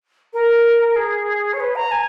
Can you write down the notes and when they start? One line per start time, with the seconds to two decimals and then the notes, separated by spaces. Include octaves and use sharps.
0.33 A#4
0.96 G#4
1.53 C#5
1.60 B4
1.75 A#5
1.91 G#5